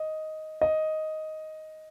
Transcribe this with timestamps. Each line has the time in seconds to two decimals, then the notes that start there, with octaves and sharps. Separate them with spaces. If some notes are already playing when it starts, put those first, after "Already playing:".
Already playing: D#5
0.61 D#5